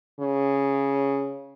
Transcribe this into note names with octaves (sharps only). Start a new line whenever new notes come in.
C#3